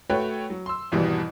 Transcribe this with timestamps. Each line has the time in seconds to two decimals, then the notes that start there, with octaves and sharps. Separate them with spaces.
0.09 A3 F#4 B4 C#5 G5
0.50 F#3
0.66 C6 E6
0.92 G#1 E2 B2 E3 G3